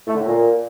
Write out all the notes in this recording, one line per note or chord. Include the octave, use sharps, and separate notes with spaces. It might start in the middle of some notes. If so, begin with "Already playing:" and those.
A3
D3
A2
A#2